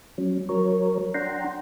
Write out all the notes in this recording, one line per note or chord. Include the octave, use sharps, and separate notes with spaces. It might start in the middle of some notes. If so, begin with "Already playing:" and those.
F#3 C#4
F#3 A#4 C#5
D4 F#5 G5 A#5 C6